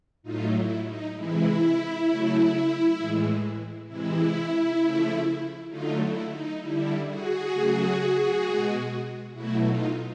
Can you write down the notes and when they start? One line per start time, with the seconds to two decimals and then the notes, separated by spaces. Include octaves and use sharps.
0.23 A2 F#3 A3 D#4 F4
0.53 E4
0.84 D#4
1.14 C3 E3 G#3 E4
2.05 C#3 F#3 A3
2.96 A2 E3 G#3
3.87 C3 E3 G#3 E4
4.78 C#3 F3 A3
5.69 D3 F#3 A3 D#4 F4
6.00 E4
6.29 D#4
6.59 D3 G3 E4
7.05 F#4 G#4
7.51 C#3 F#3 A3
8.42 B2 G#3
9.33 B2 F#3 A3 E4 F#4
9.63 D#4 F4